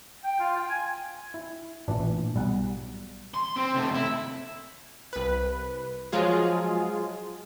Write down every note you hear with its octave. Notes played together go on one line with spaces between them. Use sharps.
G5
F4
G5
G#5
E4
A1 A#2 E3 D4
B1 G3 F#5
C6
C4
C3 A3
E4
C2 B4
F3 F#3 G#3 F4 G#4